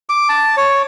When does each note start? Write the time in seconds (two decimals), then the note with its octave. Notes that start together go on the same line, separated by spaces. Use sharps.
0.09 D6
0.29 A5
0.57 C#5